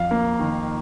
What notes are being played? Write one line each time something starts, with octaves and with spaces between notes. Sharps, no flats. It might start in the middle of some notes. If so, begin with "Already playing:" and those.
Already playing: F2 F5
A#3
D#3